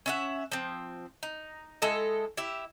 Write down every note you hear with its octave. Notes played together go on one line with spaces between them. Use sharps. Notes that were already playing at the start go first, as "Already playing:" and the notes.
C#4 E5 F#5
F3 C4
D#4
G#3 E4 A4 D#5
E4 G4 E5